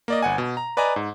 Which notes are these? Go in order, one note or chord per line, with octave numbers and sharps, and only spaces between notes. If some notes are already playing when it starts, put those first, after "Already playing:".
A#3 D5 D#5
G1 F#5 G#5
B2
A#5
B4 D5 D#5 G#5 A#5
G#2